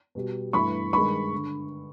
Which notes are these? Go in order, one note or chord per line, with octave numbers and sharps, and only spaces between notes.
B2 G3
G2 E3 A3 B5 C#6
G2 D#3 G#3 B5 C#6
D3